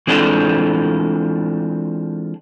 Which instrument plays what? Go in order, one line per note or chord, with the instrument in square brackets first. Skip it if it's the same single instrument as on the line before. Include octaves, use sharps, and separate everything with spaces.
[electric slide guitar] E3 G#3 C4 D4 F4 A4